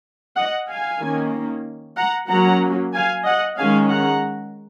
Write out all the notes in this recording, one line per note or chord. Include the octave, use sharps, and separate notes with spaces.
D#5 F#5
F5 G#5
D#3 A#3 C#4
F#5 A#5
F#3 A#3 C#4 F#5 A#5
F5 G#5
D#5 F#5
D#3 G#3 C#4 F5 G#5
F#5 A#5